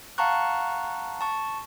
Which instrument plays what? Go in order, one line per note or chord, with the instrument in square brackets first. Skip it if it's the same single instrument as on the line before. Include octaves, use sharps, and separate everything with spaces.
[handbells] F5 F#5 A5 A#5 C#6 F#6
A5 C#6